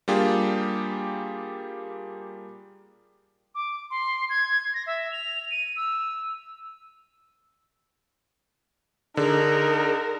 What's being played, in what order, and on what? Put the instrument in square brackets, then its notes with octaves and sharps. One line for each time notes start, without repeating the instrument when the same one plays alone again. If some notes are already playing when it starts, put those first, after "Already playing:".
[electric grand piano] G3 A#3 D4 F4 G4 G#4
[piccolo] D6
C6
G#6
A#6
E5
F7
D#7
E6
[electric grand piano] D3 [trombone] D#4 [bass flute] G#4 [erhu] A#4